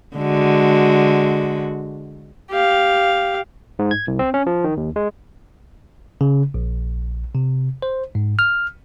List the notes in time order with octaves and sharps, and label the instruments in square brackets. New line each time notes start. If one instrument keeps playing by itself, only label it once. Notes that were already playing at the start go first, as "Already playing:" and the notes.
[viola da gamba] D3 G#3 F#4
[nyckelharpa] G4 F5
[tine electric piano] G#2
G#6
C2
C4
C#4
F3
D#3
D#2
G#3
C#3
A#1
C3
C5
G#2
F6